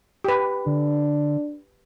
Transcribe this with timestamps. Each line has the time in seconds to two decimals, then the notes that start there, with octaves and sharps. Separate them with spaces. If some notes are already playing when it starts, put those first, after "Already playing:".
0.24 G4 B4
0.66 D3 D4